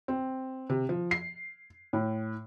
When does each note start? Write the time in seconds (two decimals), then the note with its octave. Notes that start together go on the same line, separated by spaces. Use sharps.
0.08 C4
0.70 C3
0.89 F3
1.11 C7
1.93 A2